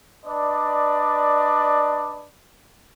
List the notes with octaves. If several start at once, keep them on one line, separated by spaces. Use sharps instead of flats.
D4 B4 D5 D#5